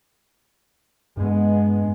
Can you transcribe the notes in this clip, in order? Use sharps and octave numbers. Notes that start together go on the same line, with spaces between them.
G2 G#3 B3